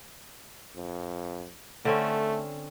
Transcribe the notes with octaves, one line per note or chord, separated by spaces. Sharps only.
F2
D3 A3 C4 C#4